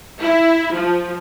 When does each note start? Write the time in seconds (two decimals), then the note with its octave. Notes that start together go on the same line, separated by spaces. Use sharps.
0.22 E4
0.74 F3